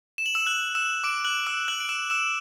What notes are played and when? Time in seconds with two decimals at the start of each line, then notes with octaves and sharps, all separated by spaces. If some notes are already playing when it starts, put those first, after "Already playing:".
0.18 E7
0.26 F#7
0.34 E6 E7
0.47 F#6 F#7
0.75 E6 E7
1.04 D6 D7
1.25 F#6 F#7
1.46 E6 E7
1.68 F#6 F#7
1.80 D7
1.89 E6 E7
2.10 E6 E7